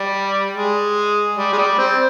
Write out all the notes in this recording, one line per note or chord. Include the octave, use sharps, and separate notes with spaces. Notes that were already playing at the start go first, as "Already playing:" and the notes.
Already playing: G3
G#3
G3
G#3
G3
C4